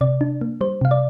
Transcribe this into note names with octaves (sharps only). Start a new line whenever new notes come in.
C3 D5
D4
A#3
G3 C5
C3 F5
D5